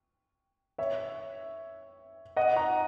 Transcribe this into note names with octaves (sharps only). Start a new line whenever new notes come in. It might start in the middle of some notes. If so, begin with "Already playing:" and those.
C#5 E5
D#5 F#5
F#5 A#5